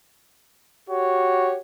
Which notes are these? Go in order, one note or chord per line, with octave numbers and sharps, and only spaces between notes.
F#4 G4 C#5